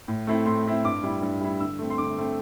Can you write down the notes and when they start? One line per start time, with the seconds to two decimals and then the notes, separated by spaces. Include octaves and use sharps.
0.08 A2
0.27 A3 C4 E4
0.46 A2 C6
0.65 A3 C4 E4
0.84 G2 D6
1.03 G3 E4
1.22 G2
1.41 G3 E4
1.60 D3 E6
1.79 A3 C4
1.90 C6
1.98 D3 D6
2.18 A3 C4